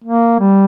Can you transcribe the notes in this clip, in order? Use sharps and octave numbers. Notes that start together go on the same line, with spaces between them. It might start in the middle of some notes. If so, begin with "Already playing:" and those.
A#3
G3